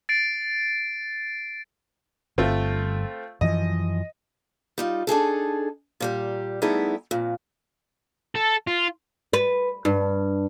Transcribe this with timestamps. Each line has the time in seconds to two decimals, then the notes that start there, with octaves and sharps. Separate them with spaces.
0.09 A6 C7 D7
2.38 G1 A3 C4 F4
3.41 F#2 E3 F3 D#5
4.78 G3 D#4 F4
5.07 D4 D#4 G#4 A4
6.00 A#2 G3 G4
6.62 G3 A3 B3 D#4 E4 G#4
7.11 F2 A#2
8.35 A4
8.67 F4
9.33 B4
9.85 G2